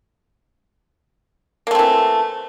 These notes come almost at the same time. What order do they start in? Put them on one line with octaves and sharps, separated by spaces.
A#3 A3 C4 E3